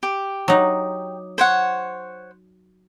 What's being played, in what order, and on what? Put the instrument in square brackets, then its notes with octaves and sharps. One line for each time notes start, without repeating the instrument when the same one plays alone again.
[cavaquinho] G4
[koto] F#3 D#4
[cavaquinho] C5 C#5 F#5